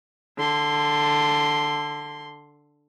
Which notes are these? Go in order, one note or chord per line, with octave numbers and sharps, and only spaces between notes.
D3 C6